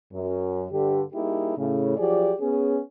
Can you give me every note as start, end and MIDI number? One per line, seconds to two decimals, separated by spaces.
0.13 0.66 42
0.71 1.02 43
0.71 1.02 50
0.71 1.02 67
1.13 1.55 55
1.13 1.55 58
1.13 1.55 63
1.13 1.55 64
1.13 1.55 67
1.13 1.55 68
1.57 1.95 45
1.57 1.95 49
1.97 2.34 53
1.97 2.34 54
1.97 2.34 67
1.97 2.34 68
1.97 2.34 74
2.40 2.80 59
2.40 2.80 61
2.40 2.80 68